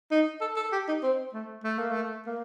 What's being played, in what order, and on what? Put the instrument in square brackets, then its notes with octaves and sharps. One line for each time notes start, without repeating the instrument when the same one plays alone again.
[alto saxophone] D#4
A4
A4
G4
D#4
C4
A3
A3
A#3
A3
A#3